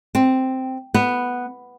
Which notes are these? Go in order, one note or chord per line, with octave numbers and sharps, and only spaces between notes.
C4
B3